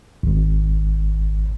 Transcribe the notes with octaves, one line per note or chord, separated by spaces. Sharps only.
G#1